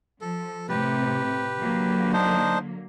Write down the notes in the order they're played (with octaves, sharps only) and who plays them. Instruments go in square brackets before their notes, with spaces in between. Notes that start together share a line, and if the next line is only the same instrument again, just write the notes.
[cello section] F3 [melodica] A4
[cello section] A2 C3 [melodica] G4 B4
[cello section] D3 F#3 A#3
[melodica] D4 D#4 C5